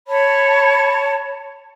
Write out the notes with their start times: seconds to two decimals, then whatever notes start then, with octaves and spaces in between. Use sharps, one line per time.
0.08 C#5 A5 B5